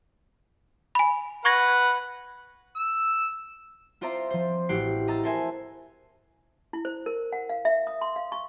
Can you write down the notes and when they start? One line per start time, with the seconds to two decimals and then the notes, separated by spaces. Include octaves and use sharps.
0.95 G#5 B5
1.45 B4 F#5 C#6 G#6 A#6
2.76 E6
4.01 C4 F4 C5 D5 E5 A#5
4.30 F3 C5
4.69 A1 E4 F#4 G4 G5 C7
5.08 D#5 A#5 E6 A6
5.23 A4 A#4 C5 E5 G#5
6.73 E4
6.85 C5
7.06 A#4
7.33 F#5
7.49 F5
7.65 E5
7.87 D#6
8.01 C6
8.16 F5
8.32 C#6